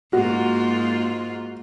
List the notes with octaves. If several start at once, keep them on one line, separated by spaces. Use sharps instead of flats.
G#2 A#3 F4 F#4